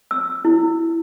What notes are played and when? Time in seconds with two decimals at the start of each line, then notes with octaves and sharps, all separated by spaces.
0.11 E6
0.45 E4